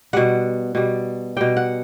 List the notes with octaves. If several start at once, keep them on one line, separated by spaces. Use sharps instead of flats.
B2 G3 F#5
B2 G3
B2 G3 G5
F#5